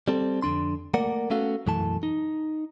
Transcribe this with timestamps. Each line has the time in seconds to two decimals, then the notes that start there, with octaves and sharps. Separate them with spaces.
0.08 G3 C4 A4
0.42 F2 D3 D4 C6
0.94 A3 A#3 A#4 D5 F#5
1.30 A3 B3 C#4 F#4 A4 F5
1.66 B1 F#2 E3 A3 A5
2.03 D#4